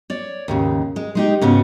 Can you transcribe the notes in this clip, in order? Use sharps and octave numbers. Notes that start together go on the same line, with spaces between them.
C#5 D5
D#2 G#2 C#3
G#3
G#3 D#4 G4
G#2 C#3 B3 F#4